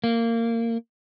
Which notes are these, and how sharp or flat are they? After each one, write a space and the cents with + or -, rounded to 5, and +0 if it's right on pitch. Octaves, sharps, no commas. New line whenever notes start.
A#3 -20